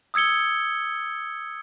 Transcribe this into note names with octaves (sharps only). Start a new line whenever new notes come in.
D#6 E6 G#6 C#7 G7